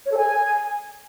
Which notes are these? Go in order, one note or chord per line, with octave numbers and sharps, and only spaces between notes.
C#5
A4
G#5